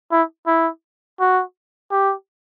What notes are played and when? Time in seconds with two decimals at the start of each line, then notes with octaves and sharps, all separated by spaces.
0.12 E4
0.47 E4
1.20 F#4
1.91 G4